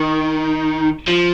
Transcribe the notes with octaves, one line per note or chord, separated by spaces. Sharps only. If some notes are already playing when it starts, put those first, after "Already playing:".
Already playing: D#3
F3